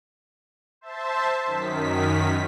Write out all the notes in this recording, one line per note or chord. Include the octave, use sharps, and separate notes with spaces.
C5 E5 A5
F#2 D#3 B6